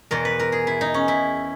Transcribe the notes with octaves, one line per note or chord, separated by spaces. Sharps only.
E2 B2 A#4
B4
A#4
G#4
E4
D#4
C#4
E4